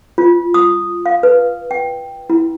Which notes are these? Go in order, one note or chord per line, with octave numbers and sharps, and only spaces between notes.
F4
D#6
F5
B4
G5
E4